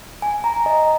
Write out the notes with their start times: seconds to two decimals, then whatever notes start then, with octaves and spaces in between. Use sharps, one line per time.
0.22 G#5
0.44 A#5
0.66 D#5